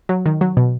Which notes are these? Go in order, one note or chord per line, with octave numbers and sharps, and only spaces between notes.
F#3
D#3
F#3
B2